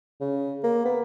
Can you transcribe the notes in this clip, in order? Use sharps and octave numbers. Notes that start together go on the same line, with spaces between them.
C#3
A#3
B3